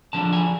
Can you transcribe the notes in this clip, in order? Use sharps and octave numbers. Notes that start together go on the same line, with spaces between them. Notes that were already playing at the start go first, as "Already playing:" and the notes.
D3 F3 A#3 D4 A5
G#5